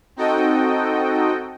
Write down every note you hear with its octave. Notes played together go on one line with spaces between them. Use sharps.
C4 D#4 F#4 A4 D#5 G5